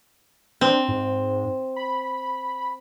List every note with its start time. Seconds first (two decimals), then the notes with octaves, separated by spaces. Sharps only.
0.61 C4 D4
0.88 G#2
1.76 B5